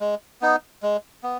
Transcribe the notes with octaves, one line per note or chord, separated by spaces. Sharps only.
G#3
B3 D#4
G#3
B3